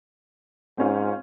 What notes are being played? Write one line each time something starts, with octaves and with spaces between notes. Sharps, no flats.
G#2 C4 C#4 F4